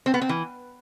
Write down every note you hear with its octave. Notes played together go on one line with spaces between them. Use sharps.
C4
B3
C4
E3